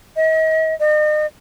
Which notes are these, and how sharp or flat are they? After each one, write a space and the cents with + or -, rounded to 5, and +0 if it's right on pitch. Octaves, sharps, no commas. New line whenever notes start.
D#5 +40
D#5 -40